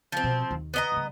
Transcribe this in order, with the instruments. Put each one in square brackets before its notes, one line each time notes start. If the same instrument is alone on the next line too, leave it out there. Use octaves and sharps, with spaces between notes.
[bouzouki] F3 C4
[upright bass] B2
D#2 D#3
[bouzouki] B3 D#5 A#5
[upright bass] C#3 G3